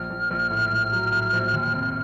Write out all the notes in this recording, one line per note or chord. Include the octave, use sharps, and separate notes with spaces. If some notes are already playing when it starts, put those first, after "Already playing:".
Already playing: A#1 F6
A#1
A#1
A2
A#1
F#3
A2
A#1
D#2
F1